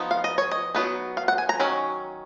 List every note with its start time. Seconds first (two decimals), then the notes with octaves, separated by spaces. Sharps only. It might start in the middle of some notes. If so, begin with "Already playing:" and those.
Already playing: F3 B3 D#4
0.11 F5
0.24 D#5
0.38 C#5
0.51 D#5
0.74 F#3 B3 D#4
1.17 F5
1.28 F#5
1.38 G#5
1.49 A#5
1.59 D#3 F#3 C#4